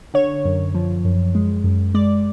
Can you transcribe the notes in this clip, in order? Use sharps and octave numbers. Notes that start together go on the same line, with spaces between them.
D3 C#5
F#2
F3
F#2
G#3
F#2
G#3 D5